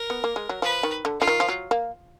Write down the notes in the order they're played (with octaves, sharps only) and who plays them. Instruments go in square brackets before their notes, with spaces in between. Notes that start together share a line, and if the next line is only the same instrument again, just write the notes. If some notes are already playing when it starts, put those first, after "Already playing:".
Already playing: [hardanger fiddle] A#4
[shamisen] B3
A#3
G#3
F#3
[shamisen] F3 [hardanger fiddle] B4
[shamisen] D#3
D3
[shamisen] D3 [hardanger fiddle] F4
[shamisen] D#3
F3
F#3
A#3